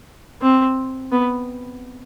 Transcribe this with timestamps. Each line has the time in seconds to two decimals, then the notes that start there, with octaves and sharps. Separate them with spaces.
0.42 C4
1.12 B3